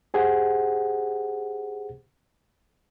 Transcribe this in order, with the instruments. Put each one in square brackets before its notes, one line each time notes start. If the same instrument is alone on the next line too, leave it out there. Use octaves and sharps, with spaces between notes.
[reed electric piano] G4 G#4 C5 F#5